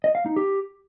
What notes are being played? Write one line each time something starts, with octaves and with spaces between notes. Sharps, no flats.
D#5
F5
D#4
G4